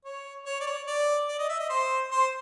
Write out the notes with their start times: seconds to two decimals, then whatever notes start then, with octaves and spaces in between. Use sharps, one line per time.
0.05 C#5
0.46 C#5
0.61 D5
0.67 C#5
0.87 D5
1.28 D5
1.39 D#5
1.49 E5
1.60 D#5
1.70 C5
2.12 C5